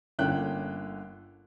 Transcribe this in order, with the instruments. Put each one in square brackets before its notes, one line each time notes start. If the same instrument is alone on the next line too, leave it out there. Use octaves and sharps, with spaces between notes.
[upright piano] G1 D3 A#3 C#4 G5 F#6